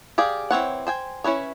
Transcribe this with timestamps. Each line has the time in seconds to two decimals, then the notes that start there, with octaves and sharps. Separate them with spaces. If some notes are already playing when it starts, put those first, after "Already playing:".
0.18 G4 G#4 D5 F5
0.51 E3 C4 C#5 F#5
0.87 C5 G5 G#5
1.24 C#4 E4 B4 C#5